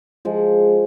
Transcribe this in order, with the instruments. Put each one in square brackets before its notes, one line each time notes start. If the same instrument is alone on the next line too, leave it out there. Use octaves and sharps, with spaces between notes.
[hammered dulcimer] F3 G#3